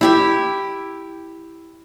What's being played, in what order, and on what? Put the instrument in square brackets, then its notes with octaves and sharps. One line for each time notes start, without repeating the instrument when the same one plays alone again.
[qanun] E4 G4 E5